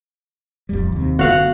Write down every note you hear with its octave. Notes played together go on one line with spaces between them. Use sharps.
D1 F2 G3
D#2 C3
F#1 D3 B3 F#4 F5 F#5